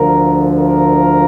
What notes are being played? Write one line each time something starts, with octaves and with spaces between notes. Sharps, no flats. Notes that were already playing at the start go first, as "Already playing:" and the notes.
Already playing: D2 D3 F3 A#4
A#4